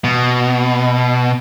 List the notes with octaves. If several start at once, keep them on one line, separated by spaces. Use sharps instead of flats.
B2